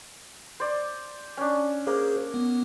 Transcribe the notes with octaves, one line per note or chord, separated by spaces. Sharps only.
C5 D5
C#4 D4
A#3 G#4 C5
B3